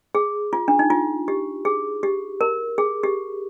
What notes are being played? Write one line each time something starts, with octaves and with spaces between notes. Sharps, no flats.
G#4
F4
D4
D#4
F4
G4
G#4
G4
A#4
G#4
G4